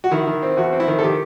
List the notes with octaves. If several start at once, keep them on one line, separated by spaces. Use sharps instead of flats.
F#4
D#3 E4
D#3
C4
E2 F#4
C4
E4
D#3
A4
D#3 G4